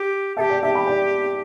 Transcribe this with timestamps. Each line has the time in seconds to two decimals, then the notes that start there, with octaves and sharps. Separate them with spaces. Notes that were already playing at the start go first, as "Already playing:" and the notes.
Already playing: G4
0.37 G4 A4 E5 A5
0.50 D5 G5
0.63 G4 E5 A5
0.75 G5 B5
0.87 D5 G5